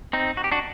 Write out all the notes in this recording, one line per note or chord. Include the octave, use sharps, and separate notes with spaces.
C4 D#4
F#4
G4
D4 F#4